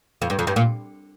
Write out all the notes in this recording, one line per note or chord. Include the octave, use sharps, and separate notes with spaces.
F2
G2
F2
G2
A#2